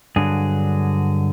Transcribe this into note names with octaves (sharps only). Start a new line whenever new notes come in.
G2 D3 F#3 G#4